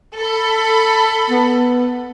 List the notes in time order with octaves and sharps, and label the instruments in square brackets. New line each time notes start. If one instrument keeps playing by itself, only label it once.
[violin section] A4 B5
[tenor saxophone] B3